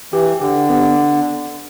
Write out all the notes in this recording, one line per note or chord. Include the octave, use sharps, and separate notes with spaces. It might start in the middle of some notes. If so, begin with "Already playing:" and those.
E3 G4
D3 G4
B3